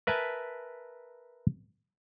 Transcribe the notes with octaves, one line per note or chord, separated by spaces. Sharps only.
A#4 B4 E5 G#5 A5